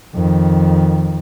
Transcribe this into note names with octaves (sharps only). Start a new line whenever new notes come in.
F2 D#3